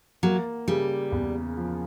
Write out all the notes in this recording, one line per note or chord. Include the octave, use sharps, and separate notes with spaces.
F#3 A#3
C#3 G3
E2
F3